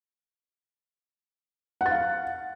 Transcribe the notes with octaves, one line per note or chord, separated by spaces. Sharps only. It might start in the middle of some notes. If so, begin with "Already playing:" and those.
F5 F#5 A6